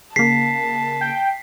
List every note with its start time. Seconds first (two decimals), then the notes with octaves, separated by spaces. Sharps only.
0.16 C#3 A#3 A5 B6 C7
1.01 G5